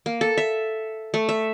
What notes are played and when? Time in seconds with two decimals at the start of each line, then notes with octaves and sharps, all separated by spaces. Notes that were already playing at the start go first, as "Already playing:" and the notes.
0.06 A#3
0.21 A4
0.37 E5
1.14 A3
1.29 E5